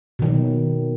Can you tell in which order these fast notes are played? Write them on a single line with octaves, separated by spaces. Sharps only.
B2 D#3 F#3